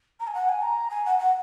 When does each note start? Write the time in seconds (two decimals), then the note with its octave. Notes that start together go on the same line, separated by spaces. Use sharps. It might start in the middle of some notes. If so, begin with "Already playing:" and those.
0.20 A#5
0.27 G#5
0.34 F#5
0.49 G#5
0.62 A#5
0.90 G#5
1.06 F#5
1.19 F#5